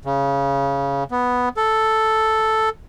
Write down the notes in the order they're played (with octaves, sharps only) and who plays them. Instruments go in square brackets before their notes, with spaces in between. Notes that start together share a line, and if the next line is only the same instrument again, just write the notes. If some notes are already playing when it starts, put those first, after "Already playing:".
[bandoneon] C#3
B3
A4